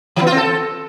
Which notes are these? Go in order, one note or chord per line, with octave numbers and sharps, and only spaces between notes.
E3
B3
F4
C4
A4